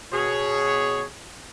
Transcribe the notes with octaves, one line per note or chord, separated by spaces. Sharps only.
B2 G#4 C#5